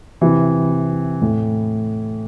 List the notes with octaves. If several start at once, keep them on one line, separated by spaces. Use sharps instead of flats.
C3 E3
A2